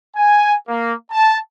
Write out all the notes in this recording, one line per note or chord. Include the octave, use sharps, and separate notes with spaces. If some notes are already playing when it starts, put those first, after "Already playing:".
G#5
A#3
A5